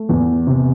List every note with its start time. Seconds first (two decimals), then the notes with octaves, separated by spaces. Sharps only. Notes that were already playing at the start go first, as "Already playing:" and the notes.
Already playing: A3
0.09 E2
0.47 C3